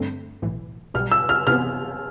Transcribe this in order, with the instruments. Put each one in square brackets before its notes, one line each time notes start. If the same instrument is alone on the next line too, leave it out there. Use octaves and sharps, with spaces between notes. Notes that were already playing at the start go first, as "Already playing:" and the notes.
Already playing: [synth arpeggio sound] G2 D3 A3 C4
B1 A2 E3
[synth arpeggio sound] B1 B2 G3 [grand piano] F6
[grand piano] E6
F6
[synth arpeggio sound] C3 E3 B3 [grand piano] F6